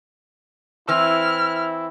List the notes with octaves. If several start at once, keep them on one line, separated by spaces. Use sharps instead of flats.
E3 C4 E4 F6